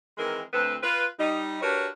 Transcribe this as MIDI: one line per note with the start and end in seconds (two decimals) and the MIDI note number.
0.18 0.41 51
0.18 0.41 52
0.18 0.41 56
0.18 0.41 60
0.18 0.41 70
0.53 0.75 38
0.53 0.75 60
0.53 0.75 71
0.82 1.05 65
0.82 1.05 71
1.19 1.61 55
1.19 1.61 63
1.62 1.86 62
1.62 1.86 66
1.62 1.86 67
1.62 1.86 70
1.62 1.86 71
1.62 1.86 73